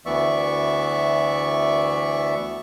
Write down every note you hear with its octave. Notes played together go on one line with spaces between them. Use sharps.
D2 E3 B3 D5 E5 C#6